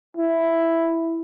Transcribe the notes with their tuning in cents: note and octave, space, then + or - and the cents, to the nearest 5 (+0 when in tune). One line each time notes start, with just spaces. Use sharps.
E4 +0